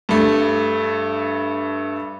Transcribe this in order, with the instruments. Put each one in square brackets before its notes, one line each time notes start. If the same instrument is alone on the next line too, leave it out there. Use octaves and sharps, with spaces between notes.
[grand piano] G2 A3